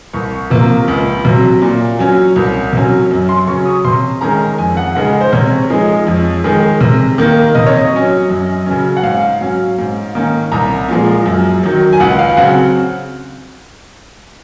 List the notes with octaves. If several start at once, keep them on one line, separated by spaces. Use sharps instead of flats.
C2 C#6
C3 F3 A#3
C#2
C3 F#3
A#2
F#3 C#4
C2
C3 F#3 C#4
F#2
C6
C#3 F#3 C#4 C#6
D#6
C3 C6
D#3 G#3 C#4 A#5
F2 G#5
F#5
C#3 G#3 D#4 F#5
C5
C3 C#5
F3 G#3 D#4
F2
D#3 G#3
C3
D#3 A#3
C3 D#5
C#5
D#5
F#3 C#4
F#2
C#3 F#3 C#4
F#5
G#2 F5
F#3 C#4
G#2
D#3 A#3 C#4
C2 A#5
A#2 F3 G#3
F#2
D#3 F#3
G#5
C#2 F#5
F5
C#3 F#3 C4 F#5